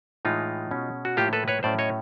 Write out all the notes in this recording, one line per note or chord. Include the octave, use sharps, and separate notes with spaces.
A2 E3 G#3 D#4 F4
B2 G#3 C#4
F#4
A2 F3 A#3 F4 G4
A4 B4
B4 C#5
A2 F#3 A3 C#4 C5 D5
C#5 D#5